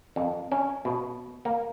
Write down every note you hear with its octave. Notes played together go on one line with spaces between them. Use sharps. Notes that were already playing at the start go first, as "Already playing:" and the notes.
F2
C#4
B2
A#3